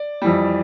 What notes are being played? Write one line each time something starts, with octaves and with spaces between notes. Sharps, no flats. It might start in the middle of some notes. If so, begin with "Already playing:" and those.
Already playing: D5
F2 E3 G3